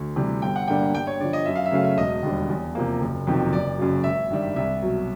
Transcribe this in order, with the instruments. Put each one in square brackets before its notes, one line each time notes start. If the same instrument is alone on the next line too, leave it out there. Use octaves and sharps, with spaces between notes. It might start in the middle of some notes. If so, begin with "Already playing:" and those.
Already playing: [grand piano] D2
C3 E3 G3
G1 G5
F#5
G2 D3 G3 A#3 G5
G2 G5
C#5
D3 D5
F3
D#5
F#2 E5
F5
E5
C#3 F#3 A3 C#4 F5
E5
E1 D#5
D#2 D3 G3
E2
C3 F3 A#3
F#1
F2 C3 D#3 F#3
F#1 D5
F#2 C#3 F#3
G#1 E5
G2 D#3 G3
C2 E5
B2 F#3